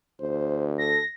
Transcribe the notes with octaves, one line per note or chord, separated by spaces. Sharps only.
D2 C5
A4 A#6